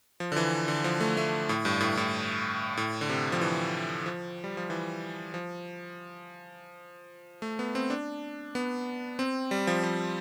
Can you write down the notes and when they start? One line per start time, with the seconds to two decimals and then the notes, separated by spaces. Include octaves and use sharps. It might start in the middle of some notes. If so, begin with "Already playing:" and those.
0.20 F3
0.32 D3
0.36 E3
0.68 D3
0.84 F3
1.00 A3
1.17 A3
1.49 A2
1.65 G2
1.81 A2
1.97 A2
2.77 A2
3.01 D3
3.09 C3
3.32 F3
3.41 E3
4.06 F3
4.44 G3
4.57 F3
4.70 E3
5.34 F3
7.42 A3
7.59 B3
7.75 C4
7.90 D4
8.55 B3
9.19 C4
9.51 G3
9.67 F3
9.83 F3